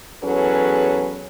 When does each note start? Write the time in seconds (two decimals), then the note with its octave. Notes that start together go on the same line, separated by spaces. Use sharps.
0.24 E2 F#3 C#4 G#4 A4 B4